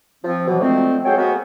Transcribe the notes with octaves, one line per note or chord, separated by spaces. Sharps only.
F3 C4
B2 E3 F#3
D3 F3 G#3 A3 C4
F#4 G#4 A4 C5 C#5 G5
G#3 A#3 B3 F#4 A#4